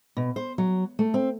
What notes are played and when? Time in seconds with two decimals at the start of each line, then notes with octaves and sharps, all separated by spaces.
0.17 B2
0.36 C5
0.58 F#3
0.99 A3
1.14 C4